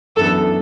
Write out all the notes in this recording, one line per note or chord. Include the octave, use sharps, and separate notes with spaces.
F#2 E3 B3 D4 A4 B4